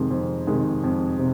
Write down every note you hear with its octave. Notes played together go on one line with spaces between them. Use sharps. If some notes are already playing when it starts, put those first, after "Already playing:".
Already playing: F2 C3 D#3 G#3
F2
C3 D#3 G#3
F2
C3